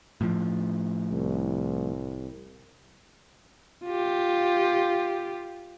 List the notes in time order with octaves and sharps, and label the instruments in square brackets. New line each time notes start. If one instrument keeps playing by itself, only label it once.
[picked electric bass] A2 F3
[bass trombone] C2
[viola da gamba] F4 G4